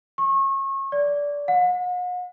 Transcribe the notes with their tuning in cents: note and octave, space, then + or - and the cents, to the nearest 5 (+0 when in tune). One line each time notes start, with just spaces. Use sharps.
C#6 -30
D5 -20
F#5 -45